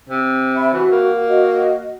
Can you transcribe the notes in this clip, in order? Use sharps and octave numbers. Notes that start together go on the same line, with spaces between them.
C3
E5 B5
E3 F#4
A#3
F#4 D#5